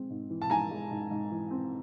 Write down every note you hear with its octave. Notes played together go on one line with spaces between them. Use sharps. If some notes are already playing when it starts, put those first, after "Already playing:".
Already playing: G#3 C4
G#2
E3
A5
G#2 G#5 A#5
G#3
G#2
G#2
E3
C4